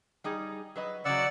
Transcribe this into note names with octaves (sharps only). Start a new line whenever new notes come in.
G3 D#4 G#4
F#3 B4 D#5
C#3 F#3 D5 F#5 E6